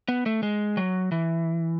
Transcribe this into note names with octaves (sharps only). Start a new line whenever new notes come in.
B3
A3
G#3
F#3
E3